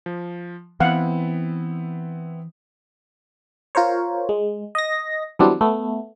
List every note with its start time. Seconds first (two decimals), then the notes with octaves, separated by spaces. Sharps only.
0.06 F3
0.80 E3 B3 C4 E4 F5 F#5
3.75 F4 A#4 C5 C#5
4.29 G#3
4.75 D#5 A#6
5.39 E3 F#3 G3 B3 C4 D4
5.61 A3 B3